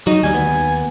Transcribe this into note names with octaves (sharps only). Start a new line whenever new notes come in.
F#3 D#4
D2 G3 G#5
D#2 B3